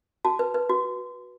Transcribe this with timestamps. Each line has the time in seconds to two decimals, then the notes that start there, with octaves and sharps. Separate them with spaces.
0.25 F#4 A5
0.39 B4
0.54 B4
0.69 F#4